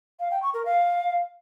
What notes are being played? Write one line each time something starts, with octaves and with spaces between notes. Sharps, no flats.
F5
G5
C#6
A#4
F5